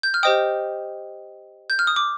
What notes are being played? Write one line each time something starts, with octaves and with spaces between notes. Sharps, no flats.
G6
F6
G4 C5 D#5 G5 D#6
G6
F6
D#6
D6